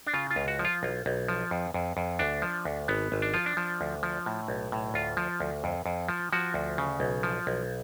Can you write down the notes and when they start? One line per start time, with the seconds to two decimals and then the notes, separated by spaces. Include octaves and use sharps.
0.07 D4
0.14 C#3 F4
0.30 F4
0.36 C#2
0.48 F#4
0.59 F3
0.65 F4
0.83 B1
1.06 B1
1.29 F3
1.51 F2
1.74 F2
1.97 F2
2.19 D2 D4
2.42 F3
2.65 D2
2.88 G#1 B3
3.12 G#1
3.22 D4
3.34 F3 F4
3.46 D4
3.57 F3
3.81 D2
4.03 F3
4.26 A2
4.48 B1
4.72 A2
4.94 D2 F4
5.17 F3
5.40 D2
5.64 F2
5.86 F2
6.09 F3
6.32 F3 F#4
6.54 D2
6.78 C#3
7.00 B1
7.23 F3
7.47 B1